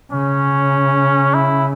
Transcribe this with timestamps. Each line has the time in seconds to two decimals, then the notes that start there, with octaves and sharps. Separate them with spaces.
0.11 C#3 C#4
1.34 E4